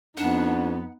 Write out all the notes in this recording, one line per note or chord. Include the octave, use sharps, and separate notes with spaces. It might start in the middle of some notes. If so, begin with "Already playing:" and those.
F2 B3 D4 D#4 F#5